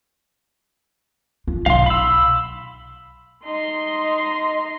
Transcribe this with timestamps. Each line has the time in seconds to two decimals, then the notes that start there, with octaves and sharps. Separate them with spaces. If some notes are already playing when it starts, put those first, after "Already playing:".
1.48 F4
1.66 B1 F5 C6
1.86 B5 E6
3.45 D#4 C6
4.03 D#5